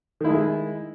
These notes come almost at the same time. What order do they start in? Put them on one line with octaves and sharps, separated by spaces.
D#3 E4 G#3